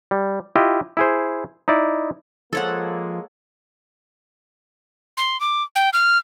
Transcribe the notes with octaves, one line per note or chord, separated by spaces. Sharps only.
G3
E4 F4 G4 D#5
E4 G#4 C5
D#4 E4 D5
F3 G#3 A#3 A4 C#5 F#5
C6
D6
G5
F6